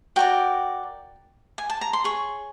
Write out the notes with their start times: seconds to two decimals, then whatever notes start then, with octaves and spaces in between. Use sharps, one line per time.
0.16 F#4 A#4 D5 G5
1.58 G#5
1.70 A5
1.81 A#5
1.93 C6
2.04 G#4 C#5 C#6